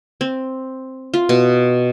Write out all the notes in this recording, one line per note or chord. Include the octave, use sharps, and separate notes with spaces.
C4
F4
B2